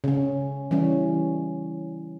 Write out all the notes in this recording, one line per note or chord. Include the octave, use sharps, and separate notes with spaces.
C#3 C#4
E3 G3 C#4